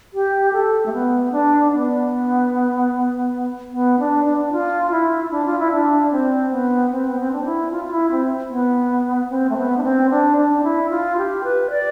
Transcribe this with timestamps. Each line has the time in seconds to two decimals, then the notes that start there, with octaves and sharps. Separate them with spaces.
0.13 G4
0.53 A4
0.86 A3
0.93 B3
1.32 D4
1.73 B3
3.72 B3
3.99 D4
4.25 D4
4.52 F4
4.91 E4
5.31 D4
5.46 F4
5.59 E4
5.72 D4
6.12 C4
6.51 B3
6.91 C4
7.07 B3
7.19 C4
7.32 D4
7.45 E4
7.71 F4
7.85 F4
7.91 E4
8.11 C4
8.50 B3
9.30 C4
9.50 A3
9.57 B3
9.78 D4
9.83 C4
10.10 D4
10.37 D4
10.63 E4
10.90 F4
11.17 G4
11.44 B4
11.70 D5